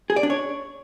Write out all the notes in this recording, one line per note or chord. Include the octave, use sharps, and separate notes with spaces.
G#4
D5
D4
C#5